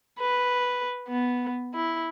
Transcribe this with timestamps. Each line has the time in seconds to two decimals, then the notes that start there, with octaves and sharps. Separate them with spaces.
0.20 B4
1.08 B3
1.75 E4